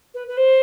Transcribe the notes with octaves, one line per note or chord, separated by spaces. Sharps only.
B4
B4
C5